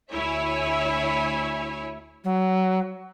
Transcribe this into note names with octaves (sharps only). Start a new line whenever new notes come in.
D2 E4 C#5 E5 G#5
F#3